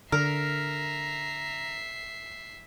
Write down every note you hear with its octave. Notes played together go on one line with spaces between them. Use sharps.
D3 A#4 E5 A#5 C7